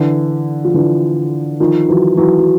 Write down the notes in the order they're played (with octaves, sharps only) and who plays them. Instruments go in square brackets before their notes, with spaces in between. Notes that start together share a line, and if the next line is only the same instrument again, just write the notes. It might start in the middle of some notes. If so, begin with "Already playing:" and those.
Already playing: [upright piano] D3 E3
F3
D3 E3
D#3 F3
E3 F#3
E3 F#3
F#3